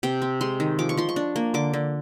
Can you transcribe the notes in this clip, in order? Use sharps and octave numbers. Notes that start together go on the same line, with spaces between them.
C3 G5
C4
G#3 C6
D#3
F3 D6
C#6
F3 C6
C#6
D4
A#3
D3 D6
D3